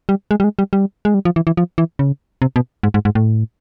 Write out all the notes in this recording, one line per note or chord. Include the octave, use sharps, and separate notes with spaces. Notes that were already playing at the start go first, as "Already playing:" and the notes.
G3
G#3
G3
G#3
G3
G3
G#3
G3
F3
E3
E3
F3
E3
C#3
C3
B2
G#2
G#2
G#2
A2